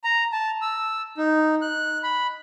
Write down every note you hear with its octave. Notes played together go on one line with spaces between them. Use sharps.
A#5
A5
E6
D#4
F#6
B5